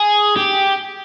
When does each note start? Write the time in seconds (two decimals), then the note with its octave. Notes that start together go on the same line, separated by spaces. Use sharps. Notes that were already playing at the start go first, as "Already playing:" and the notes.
Already playing: G#4
0.36 G4